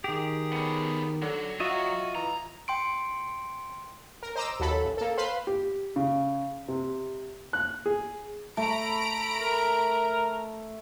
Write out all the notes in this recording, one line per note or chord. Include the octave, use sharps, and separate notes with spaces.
D#3 G4 G#4
B3 C#4
D3 F#3
F4 F#4 D#5 E5
E3 A#5
G5 C6 D7
A#4
C5 D#5 A#5 D6 E6
D#2 F#3 A4 B5
A1
A#3 A4
B4 C5 F5 B5 C6
G4
C#3
C3
F#6
G#4
A3 A#5 B5 D7
A#4